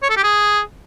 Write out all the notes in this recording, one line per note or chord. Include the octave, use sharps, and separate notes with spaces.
C#5
A4
G4
G#4